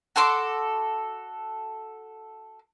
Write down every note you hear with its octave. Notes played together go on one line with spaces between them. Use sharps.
F#4 A4 C6 D6